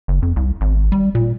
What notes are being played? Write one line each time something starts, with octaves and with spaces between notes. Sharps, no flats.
F#1
F2
C2
G#1
G3
A#2